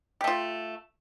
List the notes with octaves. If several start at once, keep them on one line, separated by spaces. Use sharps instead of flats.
A3 F4 G4